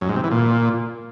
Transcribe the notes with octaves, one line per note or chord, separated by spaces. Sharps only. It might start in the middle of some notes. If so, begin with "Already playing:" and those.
F#2
G#2
C3
E3
A#2